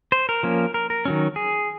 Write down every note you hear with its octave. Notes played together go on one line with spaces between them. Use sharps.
C5
A#4
F3 A#3 C#4
A#4
A#4
D#3 F#3 C#4
G#4